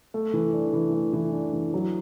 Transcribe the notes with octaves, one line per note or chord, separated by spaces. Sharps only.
A3
E3
D4
E3
A3
E3
D4
E3
F#3